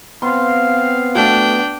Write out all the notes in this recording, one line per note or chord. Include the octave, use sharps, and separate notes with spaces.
B3 C4 F5 C6
A3 D4 F#4 G5